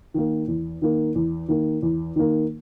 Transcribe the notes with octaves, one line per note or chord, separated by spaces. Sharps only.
D#3 A#3
E2
D#3 A#3
E2
D#3 A#3
E2
D#3 A#3